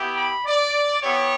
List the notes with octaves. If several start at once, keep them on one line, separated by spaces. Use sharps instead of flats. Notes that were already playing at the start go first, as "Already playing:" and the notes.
Already playing: B3 E4 G4
B5
D5
B3 E4 G4 C#5